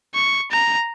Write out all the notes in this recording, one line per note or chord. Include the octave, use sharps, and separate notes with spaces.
C#6
A#5